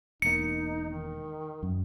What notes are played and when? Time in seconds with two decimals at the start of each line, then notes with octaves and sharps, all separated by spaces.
0.22 E1 A#3 D#4 C#7
0.90 D#3
1.63 F#2